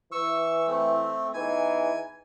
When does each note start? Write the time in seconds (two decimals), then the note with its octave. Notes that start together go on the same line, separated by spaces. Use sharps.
0.12 E3 C#6 E6
0.68 A3 C4
1.34 E2 E3 D#4 G#5